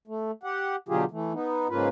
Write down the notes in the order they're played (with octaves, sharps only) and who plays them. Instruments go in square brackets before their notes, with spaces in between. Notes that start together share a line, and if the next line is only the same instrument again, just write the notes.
[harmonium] A3
G4 F#5
B2 D3 F#3 F4 G4 G#4
E3 A3
B3 D#4
G#2 C#3 A#3 F4 B4